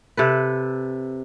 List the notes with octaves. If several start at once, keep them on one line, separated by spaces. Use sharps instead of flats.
C3 A4 B4